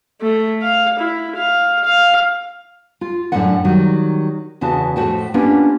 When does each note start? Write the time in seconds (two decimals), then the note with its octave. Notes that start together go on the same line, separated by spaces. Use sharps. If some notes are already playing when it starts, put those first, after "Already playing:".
0.21 A3
0.62 F5
0.99 E4
1.36 F5
1.84 F5
3.01 F4
3.32 F#2 A2 D3 G#3 D5 F#5
3.65 D#3 F#3 G3
4.61 E2 C#3 E4 F#4 A5
4.96 F2 A2 A3 F#4 G5 A5
5.34 A#3 B3 C#4 D4 F4 G4